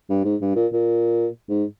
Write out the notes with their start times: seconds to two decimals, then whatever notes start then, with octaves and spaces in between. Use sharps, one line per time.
0.09 G2
0.25 G#2
0.41 G2
0.56 A#2
0.72 A#2
1.49 G#2